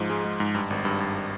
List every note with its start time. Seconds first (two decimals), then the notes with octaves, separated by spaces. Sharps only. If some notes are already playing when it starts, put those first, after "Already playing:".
Already playing: G#2 F3
0.10 G#3
0.25 G#3
0.40 G#2
0.55 G2
0.70 G#1
0.85 G2
1.00 G2